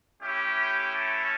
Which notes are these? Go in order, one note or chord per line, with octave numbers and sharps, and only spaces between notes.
A3 C#4 E4 G4
A4